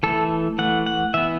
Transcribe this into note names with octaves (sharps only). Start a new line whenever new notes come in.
E3 A3 A4
E3 A3 F#5
F#5
E3 B3 E5